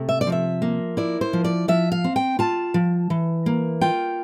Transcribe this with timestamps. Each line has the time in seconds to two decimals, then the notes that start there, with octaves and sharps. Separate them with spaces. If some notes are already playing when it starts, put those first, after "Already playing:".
Already playing: C3 A3
0.09 E5
0.21 D5
0.27 F3
0.32 E5
0.62 A#3
0.97 E4 D5
1.21 C5
1.33 F3
1.45 D5
1.68 F3 E5
1.92 F5
2.04 C4
2.16 G5
2.39 F4 A5
2.74 F3
3.10 E3
3.46 A#3
3.81 F4 G5